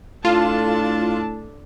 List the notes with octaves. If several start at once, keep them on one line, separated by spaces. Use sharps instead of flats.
A2 D4 F4 A4 A5